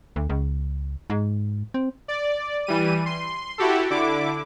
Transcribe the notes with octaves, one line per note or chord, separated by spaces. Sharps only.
D2
C#2
G#2
C4
D5
E3 G3 D#7
C6
E4 F#4 G4 A4
D3 E4 D6